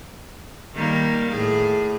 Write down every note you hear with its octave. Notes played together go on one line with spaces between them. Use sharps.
D#3 G3 A#3
A2 G#4